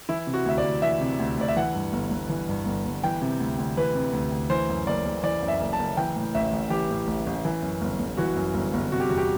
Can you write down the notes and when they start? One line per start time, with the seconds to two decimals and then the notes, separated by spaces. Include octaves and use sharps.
0.09 E3 E4
0.27 C3
0.34 F#4
0.46 D2 E5
0.58 D5
0.64 D2
0.82 E3 E5
1.01 C3
1.19 D2
1.38 D2 D5
1.48 E5
1.56 E3 F#5
1.75 G2
1.93 G1
2.11 G1
2.29 E3
2.49 G2
2.66 G1
2.85 G1
3.04 E3 G5
3.22 C3
3.40 D2
3.58 D2
3.77 E3 B4
3.95 C3
4.13 D2
4.32 D2
4.50 E3 C5
4.69 F#2
4.87 F#1 D5
5.05 F#1
5.23 E3 D5
5.42 F#2
5.48 E5
5.61 F#1
5.73 A5
5.79 F#1
5.97 E3 G5
6.16 A2
6.35 A1 E5
6.52 A1
6.70 E3 G4
6.90 A2
7.07 A1
7.26 A1
7.45 E3
7.62 F#2
7.82 G1
8.00 G1
8.17 E3 F#4
8.36 F#2
8.54 G1
8.74 G1
8.91 C3 F#4
9.00 G4
9.09 E2 F#4
9.18 G4